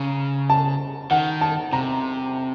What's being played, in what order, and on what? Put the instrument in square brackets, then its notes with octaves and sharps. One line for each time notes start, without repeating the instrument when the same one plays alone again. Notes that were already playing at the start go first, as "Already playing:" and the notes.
Already playing: [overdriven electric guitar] C#3 [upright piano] A#5
[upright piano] A5
[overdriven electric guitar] D#3 [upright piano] F#5
[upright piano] A5
[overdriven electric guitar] C3 [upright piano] A#5